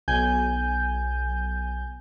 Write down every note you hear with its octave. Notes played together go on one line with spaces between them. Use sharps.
B1 G#5 G6